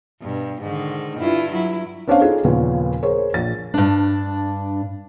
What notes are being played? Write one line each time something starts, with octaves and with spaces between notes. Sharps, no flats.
G2 B2
G#2 D3 D#3
G2 E4 F4
F#3 E4
B3 C#4 D4 C5 C#5 F5
D#4 F4 G#4 A4
D#2 A#2 C#3 F3 B3 C#4
G#4 A#4 C5 C#5
A#1 A6
G2 D4